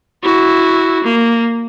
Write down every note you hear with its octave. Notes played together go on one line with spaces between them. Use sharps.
E4 F#4
A#3